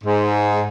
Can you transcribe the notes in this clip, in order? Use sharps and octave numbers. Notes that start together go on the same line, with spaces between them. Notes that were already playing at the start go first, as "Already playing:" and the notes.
G#2